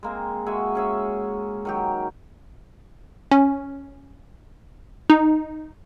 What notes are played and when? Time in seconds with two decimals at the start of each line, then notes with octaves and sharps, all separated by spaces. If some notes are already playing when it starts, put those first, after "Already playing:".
0.03 G#3 A#3 C4
0.46 G#3 F#4 G#4 E5
0.75 C#4 G#4 E5
1.65 D#3 F#3 G4
3.31 C#4
5.10 D#4